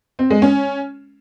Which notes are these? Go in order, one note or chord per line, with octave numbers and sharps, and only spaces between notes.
C4
G#3
C#4